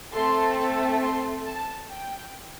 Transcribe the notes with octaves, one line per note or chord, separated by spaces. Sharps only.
A3 C4 A4 C6
C6
A5
G5